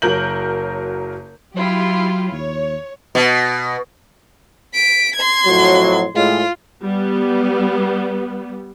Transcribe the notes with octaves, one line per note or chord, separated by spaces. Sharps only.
F#1 F#3 A#4 G6 F#7
F#3 E4 F4 G4
D#2 C#5
B2
B6 D7
C6 G#6
F2 A2 F#3
A2 G#3 F4
G3 B3